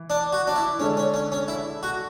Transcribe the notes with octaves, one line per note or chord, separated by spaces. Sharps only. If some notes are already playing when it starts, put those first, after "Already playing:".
Already playing: E3
D4
F#4
D4
E4
D3 G#3 C#4 D4 A4 D5
C#4
C#4
C#4
E4
F#4